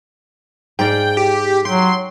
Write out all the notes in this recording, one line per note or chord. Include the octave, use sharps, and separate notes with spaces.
G#2 D5 F5 G5
G4
F#3 G5 C6